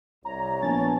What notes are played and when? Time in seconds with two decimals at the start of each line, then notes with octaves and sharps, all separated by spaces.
0.25 C2 C#5 A#5
0.62 A#1 B3 G#5 A5 A6